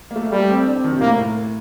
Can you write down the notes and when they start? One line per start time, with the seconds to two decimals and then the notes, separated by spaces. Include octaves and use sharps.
0.11 A#3
0.16 A3
0.24 A#3
0.32 G3 A3
0.50 C4
0.66 D4
0.75 C4
0.84 D#3
0.92 C3
1.00 A2 A#3
1.18 A2